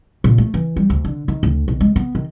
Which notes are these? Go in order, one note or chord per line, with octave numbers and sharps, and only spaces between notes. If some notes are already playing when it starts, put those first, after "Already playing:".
A#2
A3
E3
G3
D2
D3
D#3
D2
B1
G#3
B3
D#3